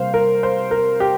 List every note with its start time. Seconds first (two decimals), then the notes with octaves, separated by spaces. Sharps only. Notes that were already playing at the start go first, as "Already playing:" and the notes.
Already playing: C3 G3 A#3 C5 F5
0.14 A#4
0.43 C5
0.71 A#4
1.00 G4